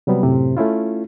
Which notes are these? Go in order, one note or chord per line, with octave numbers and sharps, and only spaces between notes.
C3 F#3 G3 B3
F#2 A2 C3
A3 C#4 E4 F4